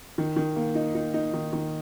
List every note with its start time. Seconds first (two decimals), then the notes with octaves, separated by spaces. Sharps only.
0.18 D#3
0.36 D#3
0.56 A#3
0.75 D#4
0.95 D#4
1.14 D#4
1.33 D#3
1.53 D#3